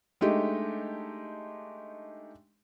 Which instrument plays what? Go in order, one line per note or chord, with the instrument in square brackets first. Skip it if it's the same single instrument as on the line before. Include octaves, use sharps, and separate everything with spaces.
[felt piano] G#3 A3 D4 D#4 G4